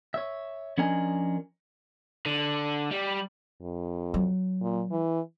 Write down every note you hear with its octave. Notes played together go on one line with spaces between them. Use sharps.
C#5 E5
F3 C#4 D4 A#4 D#5 G#5
D3
G3
F2
F#3
A#2
E3